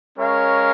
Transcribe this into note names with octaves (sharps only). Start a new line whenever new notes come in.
G#3 C#4 A#4 C#5 F5